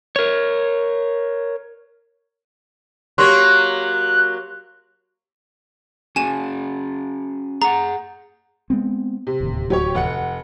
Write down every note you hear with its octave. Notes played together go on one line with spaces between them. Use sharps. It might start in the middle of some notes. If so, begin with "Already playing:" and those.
A#4 C#5
F#3 A#3 G4 C#5 C6 C#6 F#6
C#4 F#4 G#4 G#5 E7
G#4 F#5 A#5
G#3 B3 C4
C3
D1 D#2
F#3 G4 C#5
F1 F#5 C#7